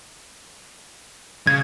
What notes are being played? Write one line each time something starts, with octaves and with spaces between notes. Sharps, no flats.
C#3 G#6